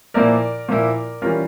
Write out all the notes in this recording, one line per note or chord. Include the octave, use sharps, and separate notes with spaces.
A#2 F3 A#3 E4 A#4 D5
A#2 F3 A#3 E4
E3 G3 C#4 F4 A#4